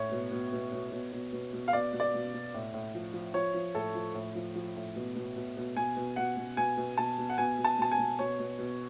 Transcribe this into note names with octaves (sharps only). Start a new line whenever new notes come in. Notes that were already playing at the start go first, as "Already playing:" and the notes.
Already playing: A2 C#5
B2
B2
B2
B2
B2
B2
B2
B2
F5
B2 D5
B2
D5
B2
B2
A2
A2
F3
F3
F3 C#5
F3
A2 A4
F3
A2
F3
F3
A2
B2
B2
B2
B2
B2 G#5
B2
B2 F#5
B2
B2 G#5
B2
B2 A5
B2
F#5
B2 G#5
B2
A5
B2 A5
G#5
B2
B2 C#5
B2
B2